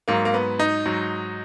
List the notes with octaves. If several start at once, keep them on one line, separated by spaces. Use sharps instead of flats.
G#2 F#3 A#3
A#3
B3
D#4
G#2 F#3